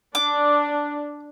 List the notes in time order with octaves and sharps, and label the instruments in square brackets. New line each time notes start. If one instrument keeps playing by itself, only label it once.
[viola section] D4 [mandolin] D6